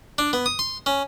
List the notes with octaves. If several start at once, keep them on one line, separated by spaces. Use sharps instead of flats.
D4
B3
D#6
C6
C#4